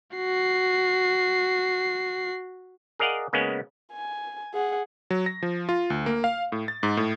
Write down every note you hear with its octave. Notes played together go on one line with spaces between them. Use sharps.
F#4 C7
G#4 A#4 D5 D#5 F5 F#5
C#3 G#3 A#3 B3 C#4
G#5
G#4 F#5
F#3
A#6
F3
F4
D2
A#3
F5
A2
A6
G#2
A2